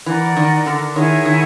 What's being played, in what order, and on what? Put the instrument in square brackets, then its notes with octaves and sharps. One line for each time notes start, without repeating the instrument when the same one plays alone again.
[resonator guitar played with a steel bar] E3 [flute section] A#4 D5 F#5
[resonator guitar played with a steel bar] D#3
D3
[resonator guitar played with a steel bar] D#3 [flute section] E4 G#4 C#5 F#5
[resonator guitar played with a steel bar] D#3